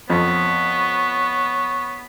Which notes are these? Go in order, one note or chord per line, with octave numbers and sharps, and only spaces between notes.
F2 B3 C#5